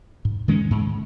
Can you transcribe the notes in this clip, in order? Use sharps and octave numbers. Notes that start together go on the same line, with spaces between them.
G#2
D#3 G#3 C#4
G#2